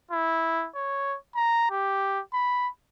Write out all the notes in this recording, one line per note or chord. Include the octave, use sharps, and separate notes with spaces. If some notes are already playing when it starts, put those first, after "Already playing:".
E4
C#5
A#5
G4
B5